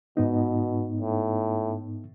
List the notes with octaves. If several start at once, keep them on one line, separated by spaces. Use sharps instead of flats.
G#2 B2 B3 D#4
A2